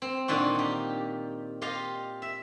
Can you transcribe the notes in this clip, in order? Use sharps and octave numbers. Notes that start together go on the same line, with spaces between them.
C4
A#2 D3 D#3 F4 F#4
D#4 G4
F4 G4 D#5 F5
E5